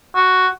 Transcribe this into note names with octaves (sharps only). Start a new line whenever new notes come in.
F#4